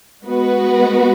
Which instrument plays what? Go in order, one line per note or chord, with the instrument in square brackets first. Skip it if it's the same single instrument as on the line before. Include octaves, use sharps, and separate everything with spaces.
[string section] G#3 B3 F#4 B4